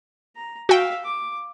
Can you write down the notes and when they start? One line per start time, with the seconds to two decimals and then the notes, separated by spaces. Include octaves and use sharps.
0.36 A#5
0.69 F#4 E5 F5 G5
1.05 D6